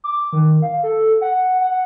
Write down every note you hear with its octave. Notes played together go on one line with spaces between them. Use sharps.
D6
D#3
F5
A4
F#5
F#5